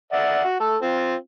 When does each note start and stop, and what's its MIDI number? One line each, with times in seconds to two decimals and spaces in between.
0.12 0.44 74
0.12 0.44 76
0.12 0.44 78
0.45 0.58 66
0.60 0.76 57
0.60 0.76 69
0.82 1.15 60
0.82 1.15 65